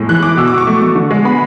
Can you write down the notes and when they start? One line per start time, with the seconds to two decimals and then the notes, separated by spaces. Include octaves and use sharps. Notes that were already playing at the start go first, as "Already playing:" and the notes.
Already playing: A2 G#3
0.09 E3 F#6
0.23 E3 D6
0.37 B2 E6
0.48 D6
0.53 B2 C#6
0.67 A3
0.82 A3
0.95 D3
1.11 G#3
1.24 B3 B5